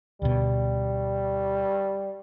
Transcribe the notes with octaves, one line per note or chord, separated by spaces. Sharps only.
D2 B2 G3